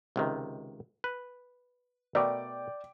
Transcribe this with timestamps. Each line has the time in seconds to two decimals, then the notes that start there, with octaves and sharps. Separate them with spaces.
0.16 C#2 C3 D#3
1.04 B4
2.15 B2 A3 A#4 D5 G5 D6